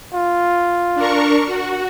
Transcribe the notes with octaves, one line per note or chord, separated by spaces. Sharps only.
F4
D4 A#4 C#6
F#4